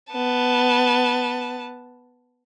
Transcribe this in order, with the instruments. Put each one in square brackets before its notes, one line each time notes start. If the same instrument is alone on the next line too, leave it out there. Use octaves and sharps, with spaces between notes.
[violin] B3 A5